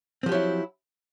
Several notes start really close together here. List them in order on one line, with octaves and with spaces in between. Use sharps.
C4 F3 G4 F#3 E4